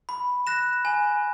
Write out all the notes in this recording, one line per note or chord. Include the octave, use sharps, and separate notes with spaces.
B5
F#6 A#6 E7
G#5